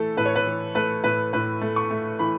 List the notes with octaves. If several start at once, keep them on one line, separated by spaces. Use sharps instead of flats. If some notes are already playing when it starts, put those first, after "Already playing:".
Already playing: E3 A3 A4
A2 B4
C#5
B4
E3
A3 B4
A2 B4
A2 B4
A3
C#6
A3
E3 B5